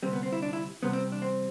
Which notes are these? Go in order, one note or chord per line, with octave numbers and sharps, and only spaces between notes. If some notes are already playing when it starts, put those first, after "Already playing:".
D2 C3 G3 C4
B3
C4
E4
D4
E4
E2 C3 G3 B3
C4
D4
C4